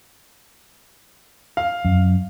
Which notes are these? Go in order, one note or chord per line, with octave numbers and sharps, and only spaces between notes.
F5
F#2